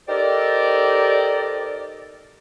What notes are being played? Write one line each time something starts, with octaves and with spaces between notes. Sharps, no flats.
D#4 G4 A4 A#4 C5 D5